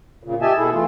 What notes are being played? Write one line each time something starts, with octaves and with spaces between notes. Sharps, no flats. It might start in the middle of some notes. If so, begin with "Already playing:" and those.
A#2 C#3
G4 D#5 E5 G#5 A5
B2 E4 G#4 A4
E3 A3 F4